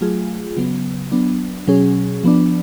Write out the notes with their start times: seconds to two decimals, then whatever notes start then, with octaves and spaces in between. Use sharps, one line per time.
0.01 F#3 A3 F4 G#4
0.57 C#3 F#3 B3
1.12 F#3 B3 D4
1.67 B2 F#3 C#4 G#4
2.24 F3 B3 D4